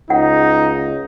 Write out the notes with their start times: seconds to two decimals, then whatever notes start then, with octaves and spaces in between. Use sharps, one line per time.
0.10 C#2 D#4 F#5